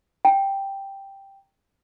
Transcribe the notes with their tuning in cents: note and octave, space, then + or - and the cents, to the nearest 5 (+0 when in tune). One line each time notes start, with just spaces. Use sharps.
G5 +0 A#5 +0